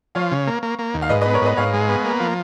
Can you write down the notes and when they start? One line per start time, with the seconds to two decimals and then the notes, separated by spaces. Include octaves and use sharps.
0.15 F3 C#5 F5
0.31 C#3
0.47 A#3
0.63 A#3
0.79 A#3
0.94 D#2
1.02 F5
1.09 G#2 B4 D#5
1.21 B4 D#5
1.26 B3
1.33 A#4 C#5
1.42 G#2 B4 D#5
1.57 G#2 C#5 F5
1.74 G#3
1.89 B3
2.04 A#3
2.20 F3